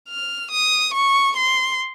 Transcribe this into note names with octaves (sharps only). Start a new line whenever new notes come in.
F6
D#6
C#6
C6